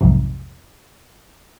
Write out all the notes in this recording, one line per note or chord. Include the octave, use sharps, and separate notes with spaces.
B1 F2 G#2 C3